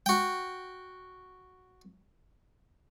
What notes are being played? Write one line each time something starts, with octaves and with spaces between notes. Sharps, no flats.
F#4 G5